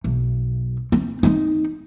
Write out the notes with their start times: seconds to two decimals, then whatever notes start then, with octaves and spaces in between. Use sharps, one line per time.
0.04 B1
0.92 C4
1.23 C4 D#4